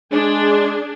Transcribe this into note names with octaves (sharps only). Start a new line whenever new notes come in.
G#3 D4 G#4